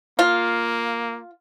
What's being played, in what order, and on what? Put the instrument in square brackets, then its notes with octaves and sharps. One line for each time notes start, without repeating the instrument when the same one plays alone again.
[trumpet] A#3 [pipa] F4